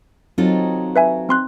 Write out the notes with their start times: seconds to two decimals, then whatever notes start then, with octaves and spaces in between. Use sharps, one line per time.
0.38 F#3 C4 D#4 F4 A4
0.96 B4 E5 G#5
1.29 C4 C6 F#6